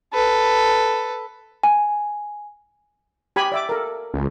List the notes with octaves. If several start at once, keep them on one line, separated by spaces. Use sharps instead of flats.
A4 B4
G#5
G4 G#5 B5
D5 E5 D6
A4 A#4
C#2